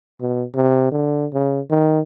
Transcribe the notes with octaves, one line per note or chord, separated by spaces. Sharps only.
B2
C3
D3
C#3
D#3